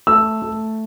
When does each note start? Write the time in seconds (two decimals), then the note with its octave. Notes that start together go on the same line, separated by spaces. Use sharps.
0.07 A3 E6
0.42 A3